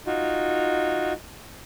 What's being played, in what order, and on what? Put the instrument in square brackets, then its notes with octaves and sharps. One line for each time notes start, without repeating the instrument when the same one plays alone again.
[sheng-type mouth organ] D#4 F4 F#4